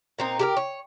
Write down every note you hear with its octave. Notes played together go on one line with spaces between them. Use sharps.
A#2 C4 D#4
G4 G#4 A#4
C#5